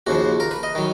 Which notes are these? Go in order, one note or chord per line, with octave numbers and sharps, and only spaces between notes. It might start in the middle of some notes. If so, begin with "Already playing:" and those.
D#2 C#3 F3 F#4
A#4
B4
D#5
D#3 F#3